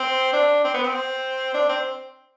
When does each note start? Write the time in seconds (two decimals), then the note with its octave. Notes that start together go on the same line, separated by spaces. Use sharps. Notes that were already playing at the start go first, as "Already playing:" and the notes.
Already playing: C4
0.33 D4
0.64 C4
0.74 B3
0.84 C4
1.54 D4
1.69 C4